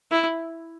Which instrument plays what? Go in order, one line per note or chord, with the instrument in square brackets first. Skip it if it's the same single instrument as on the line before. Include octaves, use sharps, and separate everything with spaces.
[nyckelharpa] E4